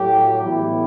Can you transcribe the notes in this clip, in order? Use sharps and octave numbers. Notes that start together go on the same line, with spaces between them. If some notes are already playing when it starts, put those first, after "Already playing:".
Already playing: A2 F#3 A3 G4
A2 E3 G3 B3 E4